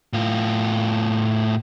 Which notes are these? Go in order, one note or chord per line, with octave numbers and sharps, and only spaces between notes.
A2 F4